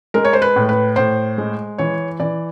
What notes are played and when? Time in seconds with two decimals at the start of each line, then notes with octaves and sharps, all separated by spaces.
0.14 G#3 A#4
0.25 C#5
0.33 C5
0.42 B4
0.56 A2
0.69 B4
0.96 A2 C5
1.38 G#3
1.78 E3 C#5
2.20 E3 D5